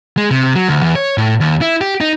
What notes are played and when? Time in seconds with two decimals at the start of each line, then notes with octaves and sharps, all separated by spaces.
0.17 G#3
0.31 C3
0.55 F#3
0.69 D2
0.82 E2
0.96 C#5
1.18 A2
1.40 D#2
1.61 E4
1.81 G4
2.01 D#4